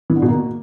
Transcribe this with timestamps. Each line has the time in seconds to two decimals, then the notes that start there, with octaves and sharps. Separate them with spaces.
0.10 E3
0.16 D3
0.22 B2
0.28 A#3